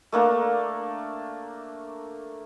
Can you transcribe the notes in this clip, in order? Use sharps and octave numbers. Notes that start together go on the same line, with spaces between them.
A3 A#3 D4 A#5